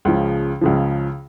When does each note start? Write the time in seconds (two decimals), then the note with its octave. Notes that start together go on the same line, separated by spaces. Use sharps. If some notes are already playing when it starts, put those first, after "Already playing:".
0.05 C#2 C#3 F3
0.61 C#2 C#3 F3